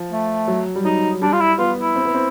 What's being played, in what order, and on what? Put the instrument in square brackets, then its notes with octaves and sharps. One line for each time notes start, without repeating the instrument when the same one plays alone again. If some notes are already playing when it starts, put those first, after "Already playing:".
Already playing: [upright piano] F3
[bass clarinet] A3
[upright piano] F#3
G3
[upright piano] F#3 [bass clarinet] D#4
[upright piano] G3 [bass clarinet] D4
[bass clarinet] F4
E4
[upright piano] B3 [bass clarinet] F4
[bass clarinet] E4
[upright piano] C4
B3
C4